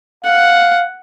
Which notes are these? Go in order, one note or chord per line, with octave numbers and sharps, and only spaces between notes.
F5 F#5